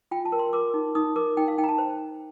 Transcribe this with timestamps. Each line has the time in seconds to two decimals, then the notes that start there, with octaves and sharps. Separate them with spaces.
0.11 F4 G5
0.25 A5
0.32 A#4
0.39 C6
0.53 A#4 D6
0.74 D#4
0.95 D#4 D#6
1.16 A#4 D6
1.37 D#4 G5
1.48 F5
1.58 D#4 G5
1.64 A#5
1.69 A5
1.78 C5